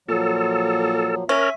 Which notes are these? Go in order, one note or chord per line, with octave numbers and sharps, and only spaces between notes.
A#2 F3 F#3 A4
C#4 A#4 E5